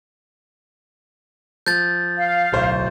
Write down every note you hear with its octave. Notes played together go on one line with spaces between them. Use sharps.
F3 G6 A6
F5
D1 B1 C5